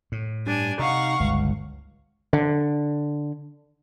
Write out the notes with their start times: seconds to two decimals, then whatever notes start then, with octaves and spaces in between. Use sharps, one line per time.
0.12 A2
0.47 G2 D4 G#5
0.79 C3 D#4 F5 F#5 C#6
1.20 G1 C#2
2.33 D3